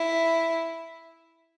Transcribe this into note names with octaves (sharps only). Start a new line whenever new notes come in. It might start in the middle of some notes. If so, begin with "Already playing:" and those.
Already playing: E4